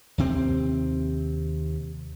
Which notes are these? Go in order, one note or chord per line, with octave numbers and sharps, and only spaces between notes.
D#2 C3 C4